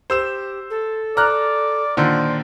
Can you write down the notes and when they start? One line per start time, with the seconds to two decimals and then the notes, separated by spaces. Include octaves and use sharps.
0.10 G4 C5 E6 E7
0.70 A4
1.17 D5 A#5 F6 F#6
1.97 A#2 D3 D#3 C5 D5